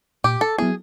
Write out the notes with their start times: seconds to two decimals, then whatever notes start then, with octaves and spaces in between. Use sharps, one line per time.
0.24 A#2 G4
0.41 A4
0.58 F#3 B3 E4 G#4